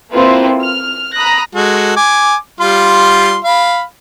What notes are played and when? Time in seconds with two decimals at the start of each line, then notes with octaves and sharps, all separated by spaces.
0.13 A#3 C4 E4 F4 A4 B4
0.63 F6
1.15 A#5 B5 D#6 F#6 A#6
1.55 G#3 F#4 A4
1.96 G#5 D6
2.60 G3 F4 C6
3.45 F5 B5